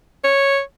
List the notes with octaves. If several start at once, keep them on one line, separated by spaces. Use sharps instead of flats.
C#5